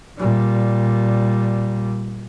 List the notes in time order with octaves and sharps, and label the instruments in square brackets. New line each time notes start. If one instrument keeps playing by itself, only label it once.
[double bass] A#2 G3